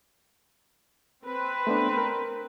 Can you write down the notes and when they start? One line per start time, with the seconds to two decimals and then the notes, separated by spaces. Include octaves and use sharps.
1.24 C4 B4
1.67 A3 B3 D4
1.97 A#4